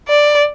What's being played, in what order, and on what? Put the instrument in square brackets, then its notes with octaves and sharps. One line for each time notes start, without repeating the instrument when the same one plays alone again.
[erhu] D5